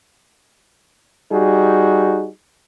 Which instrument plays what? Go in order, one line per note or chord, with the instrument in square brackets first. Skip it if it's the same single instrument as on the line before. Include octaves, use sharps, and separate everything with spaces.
[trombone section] G3 D#4 F#4 G#4